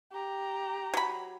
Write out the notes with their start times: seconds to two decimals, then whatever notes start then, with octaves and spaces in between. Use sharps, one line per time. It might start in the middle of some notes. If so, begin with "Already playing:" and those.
0.12 G4 A#5
0.94 F#3 B5